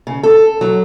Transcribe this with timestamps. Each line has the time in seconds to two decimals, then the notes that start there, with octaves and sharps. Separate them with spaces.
0.07 C#3
0.23 A4
0.61 F#3